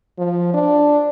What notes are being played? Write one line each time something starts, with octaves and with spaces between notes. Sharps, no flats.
F3
D4